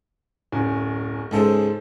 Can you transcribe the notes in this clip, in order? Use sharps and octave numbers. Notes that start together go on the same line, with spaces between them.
D1 F#2
C#2 G#2 G#3 A4 C5